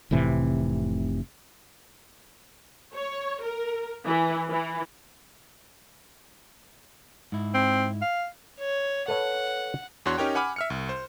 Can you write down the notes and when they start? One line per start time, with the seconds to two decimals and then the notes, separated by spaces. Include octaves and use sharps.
0.11 F1 A2 C3 E3
2.95 C#5
3.44 A#4
4.06 E3
4.48 E3
7.32 G#2 E4
7.54 C4
8.01 F5
8.59 C#5
9.08 A4 B4 C#5 F#5
10.06 E2 D4 F#4 C#5 C6 F#6
10.18 C#4 D#4 G4 A#4 C#5 G5
10.35 F#5 G#5 B5 D6 F6
10.56 E5 F6 C#7
10.70 C2
10.89 C5